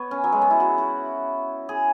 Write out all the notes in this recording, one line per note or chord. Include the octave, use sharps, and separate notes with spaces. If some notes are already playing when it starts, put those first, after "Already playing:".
Already playing: B3 B4 C#5
C#4
F#3
G#3
B3
E4
F#4
F#4
G#4